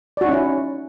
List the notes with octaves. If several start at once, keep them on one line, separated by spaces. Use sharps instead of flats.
C#4 D#4 E4 F#4 D5